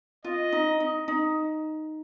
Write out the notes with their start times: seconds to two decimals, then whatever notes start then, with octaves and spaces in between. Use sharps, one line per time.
0.24 F4 D#5
0.52 D#4
0.80 D#4
1.08 D#4